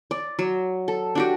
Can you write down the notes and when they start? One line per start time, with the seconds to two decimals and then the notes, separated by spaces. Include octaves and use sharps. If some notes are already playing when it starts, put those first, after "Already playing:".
0.11 D5
0.39 F#3
0.88 A4
1.15 D4 F#4 G4